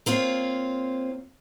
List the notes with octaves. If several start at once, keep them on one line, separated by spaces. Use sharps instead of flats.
A#3 C4 F4 C#5